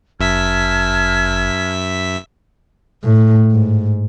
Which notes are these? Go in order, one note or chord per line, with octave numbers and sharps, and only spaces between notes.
G1 F#2 E5 A5 F6 G#6 B6
A2
G#2